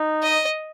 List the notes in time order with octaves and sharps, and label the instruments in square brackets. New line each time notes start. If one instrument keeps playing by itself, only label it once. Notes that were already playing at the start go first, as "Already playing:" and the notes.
Already playing: [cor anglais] D#4
[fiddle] D#5